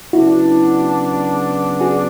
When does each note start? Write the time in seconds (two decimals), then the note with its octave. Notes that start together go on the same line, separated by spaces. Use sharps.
0.13 C#3 F#3 B3 D4 E4 F#4
1.80 F#4 G#4